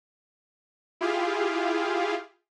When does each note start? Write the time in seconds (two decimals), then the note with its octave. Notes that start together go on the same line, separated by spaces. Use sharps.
1.01 E4 F4 G4 G#4 F5